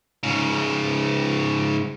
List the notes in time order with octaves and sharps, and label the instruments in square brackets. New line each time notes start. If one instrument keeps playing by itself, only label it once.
[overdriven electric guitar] G#2 C#3